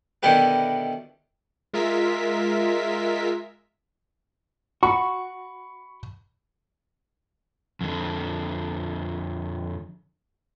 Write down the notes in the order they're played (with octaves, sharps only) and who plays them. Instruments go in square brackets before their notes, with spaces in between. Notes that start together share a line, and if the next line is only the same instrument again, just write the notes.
[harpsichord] B2 D3 D#3 E4 G4 B4
[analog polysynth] G#3 F4 A#4 E5 B6
[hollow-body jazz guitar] F#4 [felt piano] B5 C#6
[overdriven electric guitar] F2 D3